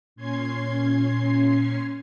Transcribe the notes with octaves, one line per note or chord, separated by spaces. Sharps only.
A#2 C#4 C6 G#6 C7